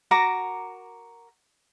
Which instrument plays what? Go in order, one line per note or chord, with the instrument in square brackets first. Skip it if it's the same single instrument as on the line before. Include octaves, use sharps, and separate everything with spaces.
[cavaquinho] F#4 A#4 A#5 D6